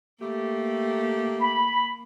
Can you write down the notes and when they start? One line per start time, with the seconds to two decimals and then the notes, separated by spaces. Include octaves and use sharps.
0.22 A3 A#3 G4
1.40 B5